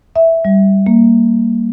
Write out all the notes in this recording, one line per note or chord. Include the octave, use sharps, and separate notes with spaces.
E5
G3
A#3